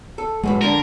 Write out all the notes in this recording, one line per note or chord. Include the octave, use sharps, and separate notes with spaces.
A4
F#2 A2 E3 G#3
F2 D3 D4 A#4